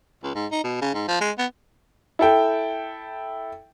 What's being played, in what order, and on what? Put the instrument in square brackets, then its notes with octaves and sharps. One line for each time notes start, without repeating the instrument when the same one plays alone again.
[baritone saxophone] C#2
G#2
D#4
B2
C#3
G#2
F3
G#3
B3
[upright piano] E4 A4 G5